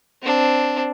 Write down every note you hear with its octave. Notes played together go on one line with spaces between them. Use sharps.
C4 D4